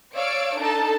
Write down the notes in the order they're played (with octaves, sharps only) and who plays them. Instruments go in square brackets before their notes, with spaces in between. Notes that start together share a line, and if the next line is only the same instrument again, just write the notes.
[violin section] C#5 D5 F5 E6 D7
D4 D#4 A4 A5